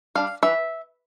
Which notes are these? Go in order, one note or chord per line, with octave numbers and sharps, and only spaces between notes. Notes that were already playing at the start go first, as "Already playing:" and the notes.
G3 D4 F5
E3 E5